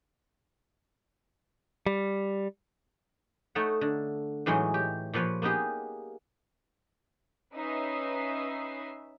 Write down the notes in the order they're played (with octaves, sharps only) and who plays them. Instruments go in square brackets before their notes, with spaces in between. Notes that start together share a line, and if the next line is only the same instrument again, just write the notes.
[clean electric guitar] G3
[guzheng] A3 D#4 A4 C#5 E5 F#5
D3
A2 E3 F#3 G#3 D#4
G4
A#2 F3 B4 C#5
A#3 B3 D#4 G4 G#4
[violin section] C#4 D#4 B4 E5 D#6 C7